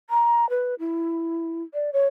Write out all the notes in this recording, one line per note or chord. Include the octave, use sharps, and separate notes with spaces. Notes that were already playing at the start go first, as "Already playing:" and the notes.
A#5
B4
E4
D5
C#5